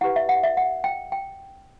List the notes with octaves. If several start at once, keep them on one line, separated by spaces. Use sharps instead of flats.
E4 G4 B4 F#5
E5
F#5
E5
F#5
G5
G5